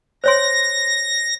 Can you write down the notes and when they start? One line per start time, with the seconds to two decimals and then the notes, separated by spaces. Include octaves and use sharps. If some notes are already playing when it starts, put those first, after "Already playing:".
0.24 C5 C#5 C6 A#6